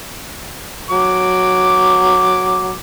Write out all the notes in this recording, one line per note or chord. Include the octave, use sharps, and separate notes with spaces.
F#3 D6